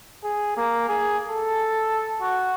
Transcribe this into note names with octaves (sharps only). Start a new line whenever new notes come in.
G#4
A#3
G#4
A4
F#4